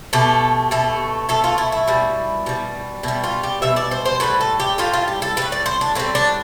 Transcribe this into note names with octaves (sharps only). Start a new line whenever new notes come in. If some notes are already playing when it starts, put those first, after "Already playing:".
B2 A3 G4
B2 A3
B2 A3 A4
F4
E4
E4
B2 G3
B2 G3
B2 G3 E4
F4
G4
B2 G3 E5
D5
C5
C5
A2 G3 B4
A4
G4
A2 G3 F4
F4
G4
A4
A2 G3 B4
D5
C5
D4
A2 G3 C4
D4